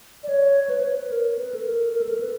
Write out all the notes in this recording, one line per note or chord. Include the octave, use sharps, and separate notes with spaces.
D5
C#5
B4
C5
B4
A#4
B4
A4
A#4
A#4
A4
A#4
B4